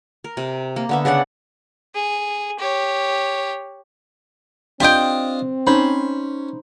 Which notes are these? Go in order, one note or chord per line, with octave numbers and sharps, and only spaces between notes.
A#4
C3
A#3
D3 B3 E5
C#3 D4 D5 F#5
G#4
G4 C#5
C4 D4 F4 G4 D#5 G5
C#4 D#4 C5 B5